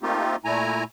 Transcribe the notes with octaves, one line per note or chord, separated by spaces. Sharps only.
A3 A#3 C4 D#4 F4 G4
A#2 A3 E4 G#5 A#5